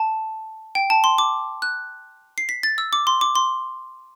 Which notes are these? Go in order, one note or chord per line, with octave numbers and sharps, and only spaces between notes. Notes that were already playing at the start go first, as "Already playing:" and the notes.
Already playing: A5
G5
A5
C6
D6
F#6
C7
B6
A6
E6
D6
C6
D6
C6